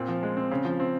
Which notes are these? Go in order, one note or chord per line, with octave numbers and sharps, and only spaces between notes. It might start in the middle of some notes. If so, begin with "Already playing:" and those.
Already playing: A#2 C4
F3
G#3
C4
C#3
F3
C4